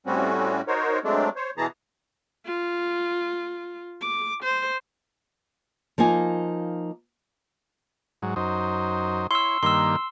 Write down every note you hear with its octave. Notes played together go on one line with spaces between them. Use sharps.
A2 G3 C4 C#4 F#4
D#4 F#4 A#4 C5 C#5
F#3 G#3 A3 C4 D4
C5 C#5
B2 E3 B3 G#4 A5 A#5
F4
D6
C5
F3 A#3 D#4 G#5
G#2 F#3
F#2 D#4 C5
E4 C#5 C6 E6
G2 D#3 A#3 C6 E6